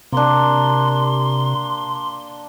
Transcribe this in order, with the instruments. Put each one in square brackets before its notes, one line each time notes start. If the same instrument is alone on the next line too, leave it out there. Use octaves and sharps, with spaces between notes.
[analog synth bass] C3 [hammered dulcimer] A#3 D4 [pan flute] C6